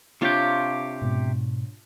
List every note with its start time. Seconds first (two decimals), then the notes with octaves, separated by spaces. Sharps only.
0.21 C3 D4 F4 G4 C#5
1.02 G#2 B2